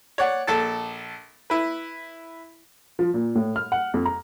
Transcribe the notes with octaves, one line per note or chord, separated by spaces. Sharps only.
C#5 D5 F#5
A#1 A4 A5
E4 B4
F3
A#2
A2
F6
F#5
F2
A#5